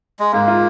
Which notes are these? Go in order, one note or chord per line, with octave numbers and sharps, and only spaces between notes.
G#3
G#2 A#3
F4